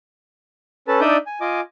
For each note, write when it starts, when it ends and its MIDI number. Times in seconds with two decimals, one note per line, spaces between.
0.88 1.00 61
0.88 1.00 69
0.88 1.00 71
0.88 1.00 81
1.01 1.17 62
1.01 1.17 63
1.01 1.17 74
1.01 1.17 76
1.01 1.17 87
1.01 1.17 91
1.27 1.39 80
1.41 1.60 65
1.41 1.60 75
1.41 1.60 80
1.41 1.60 86